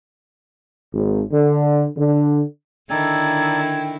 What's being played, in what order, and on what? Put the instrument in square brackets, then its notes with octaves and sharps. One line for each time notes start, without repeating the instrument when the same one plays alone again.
[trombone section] G#1
D3
D3
[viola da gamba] D3 D#3 E4 [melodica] D#4 A4 D5 [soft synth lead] G5 [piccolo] G#6